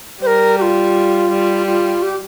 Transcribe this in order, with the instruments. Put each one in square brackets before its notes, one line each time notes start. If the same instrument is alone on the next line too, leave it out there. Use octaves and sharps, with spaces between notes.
[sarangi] G3 [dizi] C5
[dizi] A#4
G4
F4
[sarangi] G3
[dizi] F4
G4